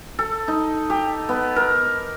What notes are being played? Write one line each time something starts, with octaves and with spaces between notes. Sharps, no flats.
A4
D#4
G4
B3
A#4